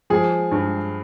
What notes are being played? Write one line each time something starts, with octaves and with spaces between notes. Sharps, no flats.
F3 G#4
G2